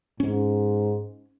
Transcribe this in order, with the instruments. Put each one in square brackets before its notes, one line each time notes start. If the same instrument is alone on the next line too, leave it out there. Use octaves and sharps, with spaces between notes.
[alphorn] G#2 [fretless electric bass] C#4